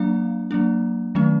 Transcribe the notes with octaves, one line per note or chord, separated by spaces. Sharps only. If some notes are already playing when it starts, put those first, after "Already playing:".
Already playing: F#3 A#3 D4 F5
F#3 A#3 D4
D#3 F#3 A3 C#4